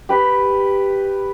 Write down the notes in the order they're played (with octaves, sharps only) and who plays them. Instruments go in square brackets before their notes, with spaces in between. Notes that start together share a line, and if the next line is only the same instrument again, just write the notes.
[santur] G4 B4